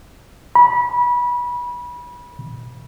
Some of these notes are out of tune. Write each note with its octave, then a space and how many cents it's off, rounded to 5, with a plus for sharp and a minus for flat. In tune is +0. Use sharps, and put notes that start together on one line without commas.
B5 -25